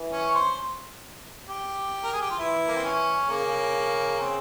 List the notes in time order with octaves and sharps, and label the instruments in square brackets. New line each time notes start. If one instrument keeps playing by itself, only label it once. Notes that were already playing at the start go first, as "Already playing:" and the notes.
Already playing: [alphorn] E3
[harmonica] C#4
C#5
C5
G4
A#4
G#4
G4
F4
[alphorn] E3 [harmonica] E4
[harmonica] A#3
C4
C#4
[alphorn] C#3 [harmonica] A#3
[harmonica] C4